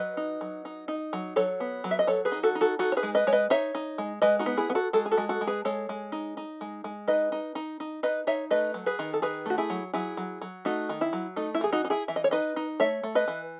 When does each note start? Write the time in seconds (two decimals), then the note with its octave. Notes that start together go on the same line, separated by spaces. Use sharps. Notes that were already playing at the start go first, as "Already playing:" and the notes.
Already playing: F#3 B4 D#5
0.17 D#4
0.41 F#3
0.65 D#4
0.88 D#4
1.13 F#3
1.36 F#3 A4 C#5
1.60 B3
1.84 F#3
1.91 E5
1.99 D#5
2.07 F#3 A4 C#5
2.25 G#4 B4
2.32 D#4
2.43 F#4 A4
2.55 D#4
2.61 F#4 A4
2.79 D#4 F#4 A4
2.92 C#5
2.97 G#4 B4
3.03 G#3
3.15 B4 D#5
3.27 G#3 C#5
3.33 B4 D#5
3.50 D#4 C#5 E5
3.75 D#4
3.98 G#3
4.22 G#3 B4 D#5
4.39 D#4 F#4
4.46 B3
4.57 E4 G#4
4.70 B3
4.75 F#4 A4
4.93 G#3 F#4 A4
5.06 G#4
5.11 F#4 A4
5.18 G#3
5.29 F#4 A4
5.41 G#3
5.47 G#4 B4
5.65 G#3 A4 C#5
5.89 G#3
6.12 D#4
6.37 D#4
6.61 G#3
6.84 G#3
7.08 D#4 B4 D#5
7.32 D#4
7.55 D#4
7.80 D#4
8.03 D#4 B4 D#5
8.27 D#4 C#5 E5
8.51 A3 B4 D#5
8.74 F#3
8.86 G#4 B4
8.99 D#3
9.14 A4
9.22 D#3 G#4 B4
9.46 A3 F#4
9.58 E4 G#4
9.70 F#3
9.94 F#3 E4 G#4
10.17 F#3
10.41 F#3
10.65 A3 D#4 F#4
10.89 D#3
11.01 E4
11.13 F#3
11.36 A3 D#4
11.55 E4
11.61 E3 G#4
11.73 D#4 F#4
11.85 D#4
11.90 E4 G#4
12.08 E3 E5
12.16 D#5
12.24 C#5
12.31 D#4 B4 D#5
12.56 D#4
12.80 A3 C#5 E5
13.03 A3
13.15 B4 D#5
13.28 E3